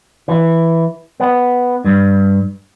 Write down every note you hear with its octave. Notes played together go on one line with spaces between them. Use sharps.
E3
B3
G2